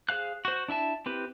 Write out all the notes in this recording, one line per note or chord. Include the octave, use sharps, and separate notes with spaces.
G#4 C5 F5 F#6
F#4 C5
D4 E4 E5 A5
C4 E4 G4 B4